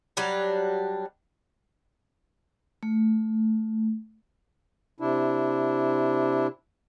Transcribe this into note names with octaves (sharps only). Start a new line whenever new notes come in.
F#3 G3 D4
A3
C3 D4 E4